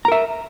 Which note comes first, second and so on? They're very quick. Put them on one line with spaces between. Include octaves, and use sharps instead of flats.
A#5 A#4 E5